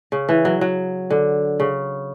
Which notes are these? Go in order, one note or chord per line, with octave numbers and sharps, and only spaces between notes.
C#3
E3
F#3
F#3
D3
C#3